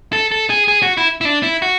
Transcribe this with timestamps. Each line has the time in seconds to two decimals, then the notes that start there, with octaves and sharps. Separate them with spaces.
0.13 A4
0.31 A4
0.50 G#4
0.68 G#4
0.82 F#4
0.97 E4
1.21 E4
1.25 D4
1.43 E4
1.62 F#4